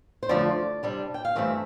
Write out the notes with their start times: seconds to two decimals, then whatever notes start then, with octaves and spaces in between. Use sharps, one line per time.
0.23 C5
0.29 F2 D3 F3 A3 D5
0.83 C3 G3 D4
1.14 G5
1.25 F5
1.36 G2 E3 A3 C4 E5